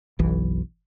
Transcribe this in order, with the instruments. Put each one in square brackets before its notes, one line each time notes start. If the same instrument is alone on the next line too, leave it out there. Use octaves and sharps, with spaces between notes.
[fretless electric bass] F#1 B1 E3